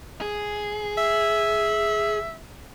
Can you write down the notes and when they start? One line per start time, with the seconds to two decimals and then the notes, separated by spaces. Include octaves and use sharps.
0.21 G#4
0.98 E5